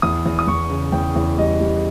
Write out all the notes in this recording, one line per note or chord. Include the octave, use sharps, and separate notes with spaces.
E2 D#6
E2
D#6
E2 C#6
C#3
E2 G5
E2
G3 D#5
G3